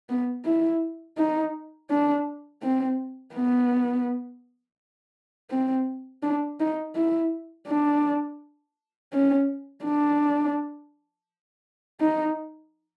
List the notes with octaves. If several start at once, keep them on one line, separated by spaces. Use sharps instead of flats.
B3
E4
D#4
D4
C4
B3
C4
D4
D#4
E4
D4
C#4
D4
D#4